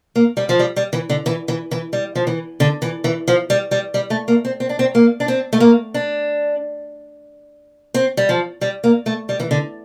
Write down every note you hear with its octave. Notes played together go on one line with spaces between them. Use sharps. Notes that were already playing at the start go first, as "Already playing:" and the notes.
A#3
G3
F3
G3
G3
E3
D3
E3
E3
E3
G3
F3
E3
D3
E3
E3
F3
G3
G3
G3
A3
A#3
C4
C4
D4
C4
A#3
D4
C4
A3
A#3
D4
C4
G3
F3
G3
A#3
A3
G3
E3
D3